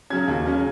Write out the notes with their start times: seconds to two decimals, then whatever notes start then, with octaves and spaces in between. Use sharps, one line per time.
0.10 C#3 F#3 C#4 G#6
0.28 D#2
0.46 C#3 F#3 C#4